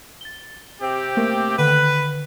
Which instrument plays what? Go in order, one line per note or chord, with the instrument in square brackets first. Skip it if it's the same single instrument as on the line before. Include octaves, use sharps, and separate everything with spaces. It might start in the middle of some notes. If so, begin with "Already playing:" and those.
[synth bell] A6 G7
[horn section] C3 C4 G4
[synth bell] A3 A#3 A#4
[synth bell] D3 D#3 [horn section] B4